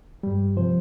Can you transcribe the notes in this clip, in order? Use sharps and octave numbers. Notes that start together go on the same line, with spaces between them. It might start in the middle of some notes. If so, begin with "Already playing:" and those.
G2 G3
C3 F3 C5